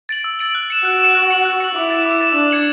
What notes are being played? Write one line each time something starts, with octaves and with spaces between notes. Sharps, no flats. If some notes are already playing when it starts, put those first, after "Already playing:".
A6 D7 F#7
E6
A6 D7 F#7
F#6
C#7 E7
F#4 F#6
C#7 E7
F#6
C#7 F#7
F#6
C#7 F#7
E4 D6
A6 E7
D6
A6 E7
D4 D6
G#6 C#7 F#7